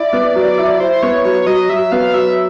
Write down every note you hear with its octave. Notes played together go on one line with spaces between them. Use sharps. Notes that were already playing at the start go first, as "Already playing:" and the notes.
Already playing: E4 D5
B3
F#3
E4
E4 C5
B3 C#5
F#3 C#5
F#3 D#5
F#3 E5
B3 F5
F#3 E5